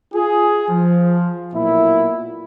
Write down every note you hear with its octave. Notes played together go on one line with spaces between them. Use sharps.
F4 G#4
F3
B1 A#2 E4